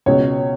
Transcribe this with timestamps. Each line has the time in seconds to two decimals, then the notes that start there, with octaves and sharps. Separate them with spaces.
0.06 C#2 B2 C#5